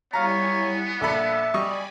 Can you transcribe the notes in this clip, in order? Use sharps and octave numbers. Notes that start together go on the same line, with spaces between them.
G3 B3 E4 C#5 F5 G#5 A#5
A#1 A4 E5 A5 B5
G3 D5 D#5 G#5 B5 C#6